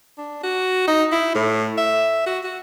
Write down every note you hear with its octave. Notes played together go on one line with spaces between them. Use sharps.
D4
F#4
D#4
E4
A2
E5
F#4
F#4